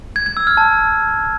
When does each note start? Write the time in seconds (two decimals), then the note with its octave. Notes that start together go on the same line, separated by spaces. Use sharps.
0.16 G#6
0.26 G#6
0.37 E6
0.47 F6
0.57 A5